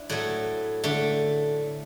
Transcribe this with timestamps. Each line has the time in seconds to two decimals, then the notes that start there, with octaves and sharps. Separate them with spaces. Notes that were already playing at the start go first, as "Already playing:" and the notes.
Already playing: D4 E4
0.10 A2 F#3 A3
0.84 D3 A3